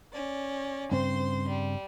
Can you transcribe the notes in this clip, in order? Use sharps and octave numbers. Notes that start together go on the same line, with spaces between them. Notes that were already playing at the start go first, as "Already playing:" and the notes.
C#4 D5
G2 C#3 C4 C5 C6
G3